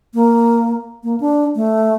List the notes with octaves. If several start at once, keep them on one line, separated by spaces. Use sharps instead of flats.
A#3
A#3
D4
A3